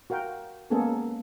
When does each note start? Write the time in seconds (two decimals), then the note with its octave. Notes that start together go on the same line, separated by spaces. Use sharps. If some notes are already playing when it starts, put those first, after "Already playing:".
0.10 F#4 A#4 F5 G5
0.70 G#3 A#3 B3 C#4 G#4 A4